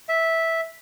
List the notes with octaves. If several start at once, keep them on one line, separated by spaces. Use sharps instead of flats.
E5